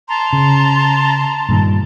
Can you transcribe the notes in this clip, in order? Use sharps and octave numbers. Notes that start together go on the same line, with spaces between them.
A5 A#5 C6
C#3
G2 A#2 D#3